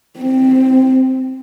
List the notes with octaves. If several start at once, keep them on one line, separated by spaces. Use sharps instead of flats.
C4